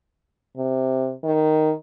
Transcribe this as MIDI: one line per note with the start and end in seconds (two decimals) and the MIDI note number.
0.57 1.13 48
1.24 1.71 51